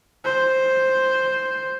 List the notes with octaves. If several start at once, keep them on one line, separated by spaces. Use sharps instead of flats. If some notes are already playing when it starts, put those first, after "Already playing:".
C5